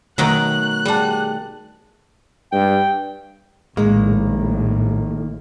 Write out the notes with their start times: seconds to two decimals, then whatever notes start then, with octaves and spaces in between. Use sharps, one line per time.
0.18 B2 D#3 F#3 A3 A#5 F#6
0.85 G3 G#4 F#5 A5
2.52 G2 G5
3.77 A#1 A2 D#3 G#3 A#3